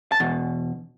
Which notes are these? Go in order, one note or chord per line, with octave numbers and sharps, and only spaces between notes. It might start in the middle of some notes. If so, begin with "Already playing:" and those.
A5
E2 B2